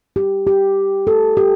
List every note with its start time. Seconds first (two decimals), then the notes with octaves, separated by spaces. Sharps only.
0.16 G4
0.47 G4
1.07 A4
1.37 G4